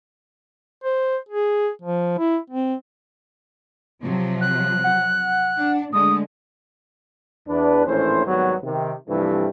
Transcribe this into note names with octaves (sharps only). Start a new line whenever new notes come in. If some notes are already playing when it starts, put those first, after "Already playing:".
C5
G#4
F3
E4
C4
C3 F3 F#3
F#6
F#5
D4
D3 G#3 A3 D#6
E2 D4 B4
A#1 A2 E3 C#4 C5
G#1 F#3 G3 B3
C3 D#3
G2 C3 E3 F3 G3 A3